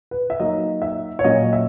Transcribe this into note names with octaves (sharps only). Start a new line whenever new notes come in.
B4
E5
F#3 A#3 D#4 D#5
E5
C#5
A#2 F#3 C#4 D#5
E5